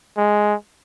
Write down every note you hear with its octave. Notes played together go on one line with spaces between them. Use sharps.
G#3